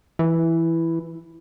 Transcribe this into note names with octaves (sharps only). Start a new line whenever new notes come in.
E3